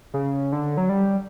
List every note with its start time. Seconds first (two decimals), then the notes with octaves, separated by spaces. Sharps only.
0.14 C#3
0.52 D3
0.77 F#3
0.89 G3